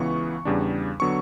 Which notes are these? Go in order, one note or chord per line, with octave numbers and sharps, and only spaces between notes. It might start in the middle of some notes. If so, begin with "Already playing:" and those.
Already playing: C#2 C#3 E3 B3 C#6
E2 C#3 G3 D4
D3 F#3 B3 C#6